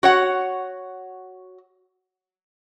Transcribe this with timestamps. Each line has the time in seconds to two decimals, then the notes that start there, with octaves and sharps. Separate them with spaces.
0.03 F#4 C#5 F#5